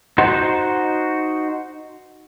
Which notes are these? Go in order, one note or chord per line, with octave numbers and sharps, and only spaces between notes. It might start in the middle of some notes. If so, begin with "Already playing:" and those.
D#4 F#4 C5